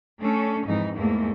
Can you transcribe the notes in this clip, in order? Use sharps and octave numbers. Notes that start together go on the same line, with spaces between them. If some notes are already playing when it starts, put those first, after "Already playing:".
A3 C#4 D4 A4
F2 G#2 E3 D#4
E2 G#2 A3 A#3